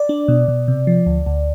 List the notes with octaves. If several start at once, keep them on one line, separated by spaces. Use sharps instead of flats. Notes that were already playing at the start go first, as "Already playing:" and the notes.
Already playing: D5
D4
B2
B2
C3
F3
D2
D2